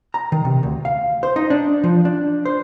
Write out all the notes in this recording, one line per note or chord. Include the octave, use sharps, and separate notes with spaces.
A#5
D#3
C3
D2
F5
C5
D#4
D4
F3
D4
C5